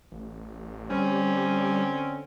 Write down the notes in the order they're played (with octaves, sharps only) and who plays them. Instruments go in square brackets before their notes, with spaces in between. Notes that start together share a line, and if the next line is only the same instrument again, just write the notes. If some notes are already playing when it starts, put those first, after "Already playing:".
[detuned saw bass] A1
[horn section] D3 C4 C#4 [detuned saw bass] G3